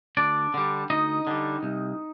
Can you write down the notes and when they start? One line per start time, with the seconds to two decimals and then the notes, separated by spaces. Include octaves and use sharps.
0.17 D2 D4 D5
0.54 D3 G3
0.90 D2 D#4 D#5
1.27 D3 G3
1.63 C2